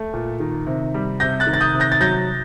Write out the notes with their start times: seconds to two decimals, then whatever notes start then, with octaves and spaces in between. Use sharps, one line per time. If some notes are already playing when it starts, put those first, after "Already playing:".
Already playing: A3
0.13 A#2
0.40 D#3
0.67 C3
0.94 G3
1.20 C3 G6 A#6
1.40 F#6 A6
1.47 D#3
1.53 A6
1.60 D#6 G6
1.74 C3
1.80 G6 A#6
1.92 A6
2.01 F#3 G6 A#6